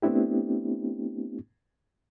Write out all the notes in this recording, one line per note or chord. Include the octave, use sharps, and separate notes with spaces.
A3 B3 C4 D4 E4 G4